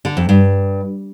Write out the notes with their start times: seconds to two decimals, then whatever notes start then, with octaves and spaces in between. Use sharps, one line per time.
0.05 D3
0.17 F2
0.29 G2